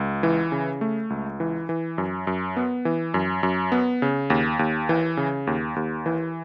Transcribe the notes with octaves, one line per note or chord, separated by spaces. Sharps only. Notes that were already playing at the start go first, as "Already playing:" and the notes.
Already playing: C#2
E3
C#3
A3
C#2
E3
E3
F#2
F#2
B3
E3
F#2
F#2
B3
C#3
D#2
D#2
E3
C#3
D#2
D#2
E3